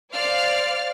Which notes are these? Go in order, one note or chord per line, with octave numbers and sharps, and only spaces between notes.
C5 D5 F5 F6